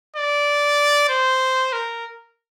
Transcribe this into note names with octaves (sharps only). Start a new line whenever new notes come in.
D5
C5
A#4